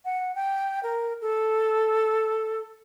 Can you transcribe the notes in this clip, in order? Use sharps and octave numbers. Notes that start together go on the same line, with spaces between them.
F#5
G5
A#4
A4